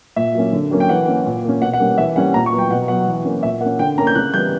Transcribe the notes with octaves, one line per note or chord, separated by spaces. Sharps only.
A#2 E5
F#3 A#3 C#4
D3
F#3 A#3 C#4
G5
E3 F#5
A#3 C#4
A#2
A#3 C#4
B2 F#5
F#5
G3 A#3 C#4
E3 E5
G3 A#3 C#4 F#5
A#2 A#5
C#6
F#3 B3
G5
B2 F#5
F#3 B3 F#5
E3
A#3 C#4
A#2 E5
A#3 C#4 F#5
D3 G5
A#3 C#4 A#5
G6
C#3 F#6
E3 G3 B3 G6